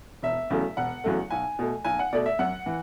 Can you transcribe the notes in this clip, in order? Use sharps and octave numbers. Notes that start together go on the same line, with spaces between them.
E1 E5
E2 C#3 F#3 A3
E1 F#5
E2 C#3 F#3 A3
B1 G#5
B2 A3
B1 G#5
F#5
B2 A3 D5
E5
F#2 F#5
E3